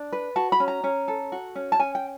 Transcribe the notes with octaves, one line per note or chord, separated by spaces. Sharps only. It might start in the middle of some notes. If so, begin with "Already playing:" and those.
Already playing: D4
B4
F#4 A5
B5
C#4
A#5
C#4
A4
F#4
C#4
A5
C#4 G#5
G5